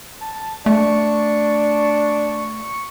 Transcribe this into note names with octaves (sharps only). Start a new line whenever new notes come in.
A5
A3 D4 C#6